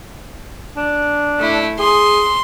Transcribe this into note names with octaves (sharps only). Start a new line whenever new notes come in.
D4
A3 E4
G#4 C6